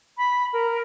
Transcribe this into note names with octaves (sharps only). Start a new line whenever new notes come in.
B5
A#4